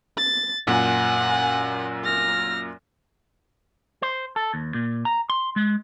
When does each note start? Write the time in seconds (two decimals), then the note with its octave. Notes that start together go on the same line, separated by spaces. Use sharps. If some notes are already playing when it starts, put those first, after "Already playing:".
0.17 A6
0.67 F#2 A#2 F#5 G#5
2.04 F6 A#6
4.02 C5
4.36 A4
4.54 D#2
4.74 A#2
5.05 A#5
5.30 C6
5.56 G#3